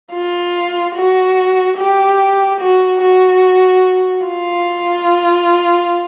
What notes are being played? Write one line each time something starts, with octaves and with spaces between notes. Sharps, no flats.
F4
F#4
G4
F#4
F#4
F4